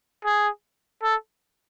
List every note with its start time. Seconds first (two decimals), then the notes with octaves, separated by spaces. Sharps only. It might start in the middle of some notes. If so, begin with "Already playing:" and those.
0.25 G#4
1.03 A4